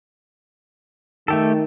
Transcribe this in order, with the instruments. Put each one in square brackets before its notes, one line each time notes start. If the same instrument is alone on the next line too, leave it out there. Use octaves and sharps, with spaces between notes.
[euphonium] D#3 [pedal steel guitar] A3 G4 A4